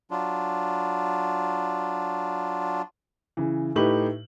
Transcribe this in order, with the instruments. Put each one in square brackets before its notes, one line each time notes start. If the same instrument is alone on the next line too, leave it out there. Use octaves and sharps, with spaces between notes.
[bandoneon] F#3 D4 F4
[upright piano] C#3 E3
A2 A3 D#4 G4 B4 F#7